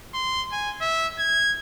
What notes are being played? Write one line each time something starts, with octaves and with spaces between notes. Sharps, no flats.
C6
G#5
E5
G#6